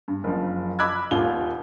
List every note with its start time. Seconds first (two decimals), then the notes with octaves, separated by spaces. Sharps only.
0.08 G2
0.24 F#1 F3
0.79 D#5 B5 D6 E6 F#6 G#6
1.11 D#1 D#2 F4 G7